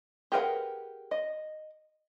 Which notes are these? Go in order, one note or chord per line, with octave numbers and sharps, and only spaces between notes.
G4 G#4 A#4 B4 F#5
D#5